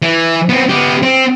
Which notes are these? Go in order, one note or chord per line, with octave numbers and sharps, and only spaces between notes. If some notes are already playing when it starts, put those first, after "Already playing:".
E3
B3 C4
B3 G4
C4